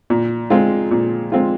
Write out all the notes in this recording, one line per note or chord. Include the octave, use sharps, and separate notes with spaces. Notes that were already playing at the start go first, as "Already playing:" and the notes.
A#2
G#3 C4 F4
A#2
G#3 C4 F4